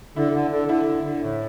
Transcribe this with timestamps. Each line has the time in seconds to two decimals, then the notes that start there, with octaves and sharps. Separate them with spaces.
0.16 D3 E4
0.33 D3
0.51 D3
0.68 D3 E4
0.86 D3
1.04 D3
1.21 A2